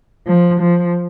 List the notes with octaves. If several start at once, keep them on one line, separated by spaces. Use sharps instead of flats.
F3
F3